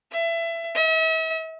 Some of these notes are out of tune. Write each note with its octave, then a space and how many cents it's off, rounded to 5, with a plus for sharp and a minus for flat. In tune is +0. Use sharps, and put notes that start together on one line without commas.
E5 +25
E5 -40